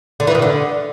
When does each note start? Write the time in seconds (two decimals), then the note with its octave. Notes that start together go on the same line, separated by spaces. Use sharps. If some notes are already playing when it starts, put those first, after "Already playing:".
0.20 D3
0.27 E3
0.35 D#3
0.42 D3